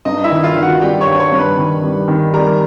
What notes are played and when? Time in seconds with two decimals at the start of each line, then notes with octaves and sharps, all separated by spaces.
0.05 G2 D#4 D#5
0.24 E4 E5
0.31 D#3
0.43 F4 F5
0.56 D#3
0.62 F#4 F#5
0.81 G3 G4 G5
1.01 C#5 C#6
1.06 G2
1.20 C#5 C#6
1.32 G2
1.38 B4 B5
1.58 D#3
1.83 G3
2.08 D#3
2.33 G3 A#4 A#5